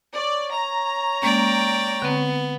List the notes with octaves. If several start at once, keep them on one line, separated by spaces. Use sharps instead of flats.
C#5 D5
A#5
G#3 A#3 C#4 D5 G5
D3 B3 C4